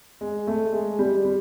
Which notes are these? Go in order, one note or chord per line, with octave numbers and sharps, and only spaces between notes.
G#3
A3
G#3
G3
G3